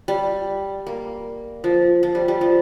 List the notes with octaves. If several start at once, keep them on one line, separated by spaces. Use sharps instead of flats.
G3
A#3
F3
F3
G3
G3
F3